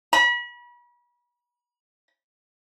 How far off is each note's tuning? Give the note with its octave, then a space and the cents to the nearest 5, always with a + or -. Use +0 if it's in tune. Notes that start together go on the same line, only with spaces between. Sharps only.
B5 -35